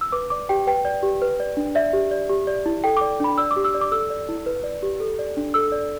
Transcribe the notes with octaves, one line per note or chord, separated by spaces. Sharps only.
E6
B4 D6
D5 D6
G4 G5
B4 G5
D5
G4
B4
D5
D4
D5 E5
G4
D5
G4
D5
E4
A4 G5
D5 D6
D4 B5
D5 E6
D6
G4
E6
D5
D6
A4 E6
D5
E4
B4
D5
G4
A4
D5
D4
A4 E6
D5